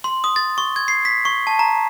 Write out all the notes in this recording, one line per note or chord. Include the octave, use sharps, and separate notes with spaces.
C6
D#6
A6
C#6
G#6
C7
B6
C#6
A5
A#5